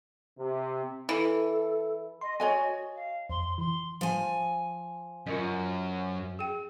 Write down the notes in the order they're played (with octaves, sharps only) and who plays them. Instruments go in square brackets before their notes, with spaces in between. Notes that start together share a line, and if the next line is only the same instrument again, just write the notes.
[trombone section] C3
[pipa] E3 [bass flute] A4
[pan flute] D#5 [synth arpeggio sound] C6
[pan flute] F#4 [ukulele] C#5 D#5 G#5
[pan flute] F5
[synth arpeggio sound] F2 [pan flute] C6
[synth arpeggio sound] E3 [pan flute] C6
[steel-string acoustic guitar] F3 G#5
[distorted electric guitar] F#2 [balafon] F4 A#4 D#5
[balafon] G#4 G5